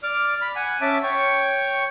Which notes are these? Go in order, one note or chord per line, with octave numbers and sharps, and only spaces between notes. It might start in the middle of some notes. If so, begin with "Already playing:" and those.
D5 D6 F6
B5
F#5 G#5
C#4 E5 A5 D6
C#5 G5 C#6